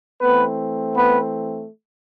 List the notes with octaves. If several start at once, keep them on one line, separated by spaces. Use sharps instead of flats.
E3 A3 B3 C4 B4
B3 B4